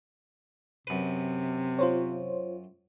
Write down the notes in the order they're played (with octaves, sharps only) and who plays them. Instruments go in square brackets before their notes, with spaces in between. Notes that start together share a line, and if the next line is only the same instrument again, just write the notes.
[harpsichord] F#2 B4 [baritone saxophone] C3
[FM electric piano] F4 C5 C#5